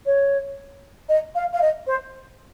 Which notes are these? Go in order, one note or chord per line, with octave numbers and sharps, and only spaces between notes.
C#5
D#5
F5
F5
D#5
C5